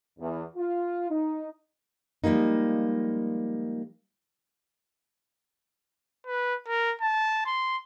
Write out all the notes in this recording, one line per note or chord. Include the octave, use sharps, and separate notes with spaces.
E2
F4
D#4
F3 G3 G#3 A#3 D#4
B4
A#4
A5
C6